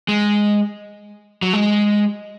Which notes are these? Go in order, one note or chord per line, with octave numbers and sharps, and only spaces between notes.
G#3
F#3
G#3